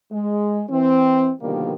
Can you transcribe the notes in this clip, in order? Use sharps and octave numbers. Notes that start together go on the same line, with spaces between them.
G#3
E3 C4
B2 D3 D#3 F3 G3 A#3